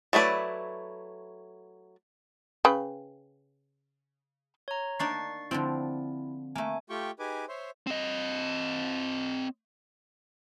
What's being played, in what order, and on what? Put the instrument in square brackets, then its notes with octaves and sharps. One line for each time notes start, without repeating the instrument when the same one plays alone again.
[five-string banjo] F#3 A3 E4 B4 D5
[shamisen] C#3 B4 G5
[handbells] C#5 A#5
[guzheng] A#3 D4 D#4 [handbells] C#6 A6 C7
[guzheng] D3 F3 C4 [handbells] E4
[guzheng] A3 A#3 [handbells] G#5
[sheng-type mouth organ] A3 F4 G4 G5 C#6
D#4 G4 G#4 B4 G#5 D6
C5 C#5 E5 C6
[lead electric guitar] C4 D#5